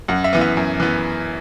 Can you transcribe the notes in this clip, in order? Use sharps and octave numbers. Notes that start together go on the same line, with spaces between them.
F#2 F#5
E5
E3 B3
E5
F#2
E3 B3